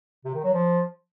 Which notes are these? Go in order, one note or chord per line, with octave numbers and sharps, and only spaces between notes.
C3
D#3
F#3
F3